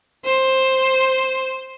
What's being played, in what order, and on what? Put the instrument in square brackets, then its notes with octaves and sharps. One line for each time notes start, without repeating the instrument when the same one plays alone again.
[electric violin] C5